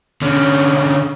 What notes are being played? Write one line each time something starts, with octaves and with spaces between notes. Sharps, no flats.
D3 C#4